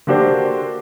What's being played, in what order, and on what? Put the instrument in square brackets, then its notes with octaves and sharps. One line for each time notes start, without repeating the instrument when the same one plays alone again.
[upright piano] D3 A#3 D4 F#4 G4 C5